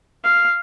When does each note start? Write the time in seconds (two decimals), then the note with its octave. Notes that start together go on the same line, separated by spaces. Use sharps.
0.24 F5